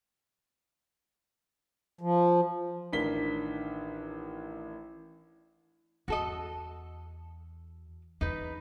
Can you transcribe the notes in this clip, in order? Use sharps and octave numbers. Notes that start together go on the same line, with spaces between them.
F3
A1 D#3 D4 A#4 B6 G7
E2 F#4 A4 D#5
E2 D#4 B4